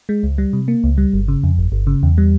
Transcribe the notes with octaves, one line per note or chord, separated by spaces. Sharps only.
G#3
C#2
G3
C3
A#3
C#2
G3
G1
C#3
F2
G1
G1
C#3
E2
G3